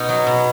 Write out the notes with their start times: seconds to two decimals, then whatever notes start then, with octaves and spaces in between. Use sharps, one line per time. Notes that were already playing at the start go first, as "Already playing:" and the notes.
Already playing: B2 D#4
0.09 F#3
0.27 B2